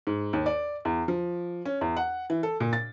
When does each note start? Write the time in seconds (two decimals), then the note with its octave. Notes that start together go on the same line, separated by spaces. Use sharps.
0.07 G#2
0.33 D#2
0.46 D5
0.85 E2
1.08 F3
1.65 C#4
1.81 E2
1.97 F#5
2.30 E3
2.43 A4
2.60 A#2
2.73 A6